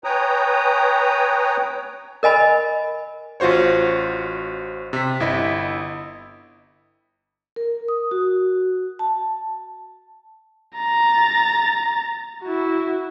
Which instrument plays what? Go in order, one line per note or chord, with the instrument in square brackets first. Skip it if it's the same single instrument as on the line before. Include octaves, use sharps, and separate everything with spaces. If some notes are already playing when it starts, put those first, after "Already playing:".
[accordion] B4 C#5 G5 G#5 A#5 D#6
[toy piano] A#4 D#5 G#5 B5
[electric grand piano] A1 F4 F#4 C5 C#5
C3 B6
G1 E4 D#5 B6
[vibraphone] A#4
D#6
F#4
A5
[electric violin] A#5 A6
E4 F#4